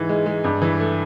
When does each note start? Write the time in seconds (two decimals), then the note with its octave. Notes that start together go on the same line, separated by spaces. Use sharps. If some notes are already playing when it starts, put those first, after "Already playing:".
Already playing: G#2 E3
0.09 G#3
0.26 G#3
0.44 G2
0.62 E3
0.80 A3